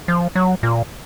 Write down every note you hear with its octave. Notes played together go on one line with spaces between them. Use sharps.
F3
F#3
A#2